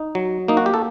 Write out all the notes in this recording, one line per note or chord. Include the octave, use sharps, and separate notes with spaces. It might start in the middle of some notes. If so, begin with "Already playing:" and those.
Already playing: D#4
F#3
A#3 D#4
F#4
G4
A4